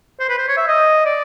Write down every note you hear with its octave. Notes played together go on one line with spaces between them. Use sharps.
C5
B4
C5
C#5
E5
D#5
D5